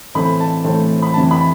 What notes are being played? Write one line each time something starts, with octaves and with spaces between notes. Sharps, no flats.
A2 E3 A3 C4 B5
A5
A2 E3 A3 C4 A5
B5
F2 C3 E3 A5
B5